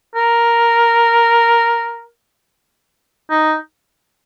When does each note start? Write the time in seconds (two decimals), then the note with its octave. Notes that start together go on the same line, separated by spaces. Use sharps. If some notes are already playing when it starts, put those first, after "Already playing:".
0.16 A#4
3.30 D#4